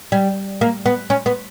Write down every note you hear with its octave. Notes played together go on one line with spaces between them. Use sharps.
G3
A#3
B3
C#4
B3